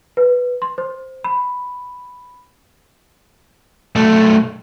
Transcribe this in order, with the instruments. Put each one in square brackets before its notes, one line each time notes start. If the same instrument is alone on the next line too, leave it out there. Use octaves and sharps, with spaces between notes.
[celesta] B4
C6
C5
B5
[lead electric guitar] B1 A3